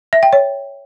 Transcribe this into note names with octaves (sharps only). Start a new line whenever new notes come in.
E5
G5
C#5